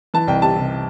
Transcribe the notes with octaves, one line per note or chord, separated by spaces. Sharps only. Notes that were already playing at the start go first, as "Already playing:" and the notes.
E3 A5
C2 G5
C3 A5
C3